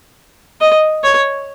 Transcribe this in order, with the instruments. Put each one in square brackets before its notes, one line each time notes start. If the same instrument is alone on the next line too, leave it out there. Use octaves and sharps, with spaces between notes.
[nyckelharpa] D#5
C#5